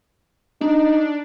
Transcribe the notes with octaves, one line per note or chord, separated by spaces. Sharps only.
D4 D#4